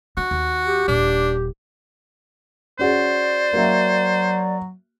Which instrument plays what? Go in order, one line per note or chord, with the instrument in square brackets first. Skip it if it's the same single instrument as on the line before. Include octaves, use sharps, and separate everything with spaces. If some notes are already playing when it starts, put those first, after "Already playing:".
[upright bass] D4 [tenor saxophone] F#4
[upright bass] D#2
[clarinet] G4
[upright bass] D#1 A#2 [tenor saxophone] D4
[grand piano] C#4 F#4 G#4 [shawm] C5 [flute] D5
[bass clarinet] F#3 [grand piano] A#3 F#4 E5